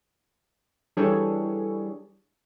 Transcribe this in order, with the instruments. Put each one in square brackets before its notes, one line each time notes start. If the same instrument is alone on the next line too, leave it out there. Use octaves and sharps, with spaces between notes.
[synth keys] E3 G3 D4 G#4 A4 C#5